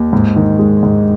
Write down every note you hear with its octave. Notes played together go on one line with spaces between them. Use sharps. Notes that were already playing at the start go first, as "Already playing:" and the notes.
Already playing: D#2
G#2
D#3
G#3
G#2